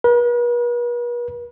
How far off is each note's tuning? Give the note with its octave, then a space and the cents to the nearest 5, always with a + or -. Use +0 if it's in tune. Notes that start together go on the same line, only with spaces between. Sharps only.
B4 -45